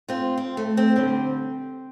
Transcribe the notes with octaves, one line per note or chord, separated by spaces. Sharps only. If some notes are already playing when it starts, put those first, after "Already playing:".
C4 F4
C4
A3
C4
G2 D3 G3 C4